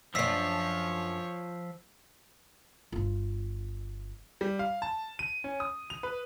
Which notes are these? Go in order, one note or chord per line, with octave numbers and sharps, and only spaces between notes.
F#2 F3 D4 C#5 E6 B6 C7
G1 F4
G3
F5
A5
D#7
C#4
D#6
F7
B4